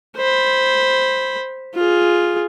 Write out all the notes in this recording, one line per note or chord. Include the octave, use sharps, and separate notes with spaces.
C5 B5
F4 G#4